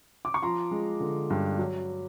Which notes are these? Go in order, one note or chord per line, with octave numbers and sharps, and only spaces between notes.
D6
C#6
F3 A#5 C6
G#3
D3
G2
F#3